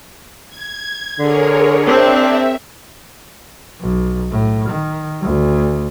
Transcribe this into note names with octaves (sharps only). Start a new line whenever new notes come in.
G#6
D3 G#4 A#4 C#5
C4 D4 E5
B1
A2
D#3
D2